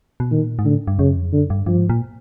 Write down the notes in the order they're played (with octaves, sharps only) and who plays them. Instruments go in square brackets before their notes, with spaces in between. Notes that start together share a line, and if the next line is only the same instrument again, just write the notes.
[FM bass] B2
[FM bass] A#2 [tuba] D#3
[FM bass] G#2
[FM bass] A2 [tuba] D3
[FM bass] G2
[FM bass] F#2 [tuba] C#3
[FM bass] F2
[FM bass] F#2 [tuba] D3
[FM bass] G2
[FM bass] G2 [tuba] F3
[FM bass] G#2
A#2